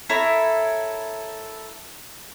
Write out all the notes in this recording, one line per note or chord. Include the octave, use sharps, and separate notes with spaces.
E4 A4 A#4 C#5